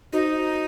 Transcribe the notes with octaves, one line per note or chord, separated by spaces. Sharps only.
D#4 F#4 C5 D#5